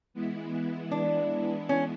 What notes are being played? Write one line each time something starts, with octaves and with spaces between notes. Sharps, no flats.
E3 G#3 B3 E4
D4
C#4